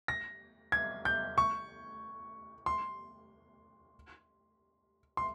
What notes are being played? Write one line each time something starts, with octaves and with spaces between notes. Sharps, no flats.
A#6
G#6
G6
C#6
C6
C6